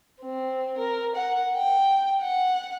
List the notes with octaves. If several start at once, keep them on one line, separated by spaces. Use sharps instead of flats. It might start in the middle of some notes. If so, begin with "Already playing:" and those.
C4
A#4
F#5
G5
F#5